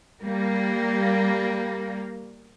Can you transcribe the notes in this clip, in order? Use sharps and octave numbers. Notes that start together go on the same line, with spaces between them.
G3 A#3